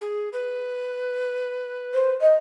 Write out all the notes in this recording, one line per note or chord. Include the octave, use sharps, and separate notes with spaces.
G#4
B4
C5
D#5